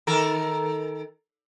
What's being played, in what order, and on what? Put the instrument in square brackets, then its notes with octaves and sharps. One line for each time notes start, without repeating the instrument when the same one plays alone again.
[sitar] D#3 A4 A#4